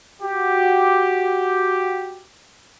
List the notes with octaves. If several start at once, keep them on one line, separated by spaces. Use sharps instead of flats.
F#4 G4